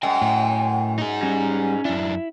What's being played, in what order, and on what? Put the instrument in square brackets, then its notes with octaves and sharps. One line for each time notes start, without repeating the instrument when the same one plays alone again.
[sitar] F#2 [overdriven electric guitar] D#5 G#5 [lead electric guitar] G5
[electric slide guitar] A2
[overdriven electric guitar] D#4 G#4
[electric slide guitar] G3 [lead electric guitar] C#4
[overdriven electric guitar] F#2 D4 [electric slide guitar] E4